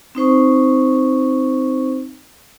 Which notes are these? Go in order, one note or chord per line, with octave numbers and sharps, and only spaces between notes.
C4 D#4 C5 C#6